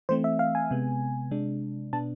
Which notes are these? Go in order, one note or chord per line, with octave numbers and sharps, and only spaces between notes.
E3 A3 C4 C5
E5
F5
G#5
C3 G#3 B3
C3 G#3 D4
B2 B3 D4 A5